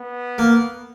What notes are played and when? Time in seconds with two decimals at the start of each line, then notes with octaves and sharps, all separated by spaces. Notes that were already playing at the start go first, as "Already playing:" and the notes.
Already playing: B3
0.38 A#3